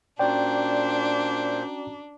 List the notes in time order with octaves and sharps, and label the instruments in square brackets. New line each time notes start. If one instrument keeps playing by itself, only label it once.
[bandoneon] A#2 C5 [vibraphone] C#4 F#4 A#5 [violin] D4 [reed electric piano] D5 G5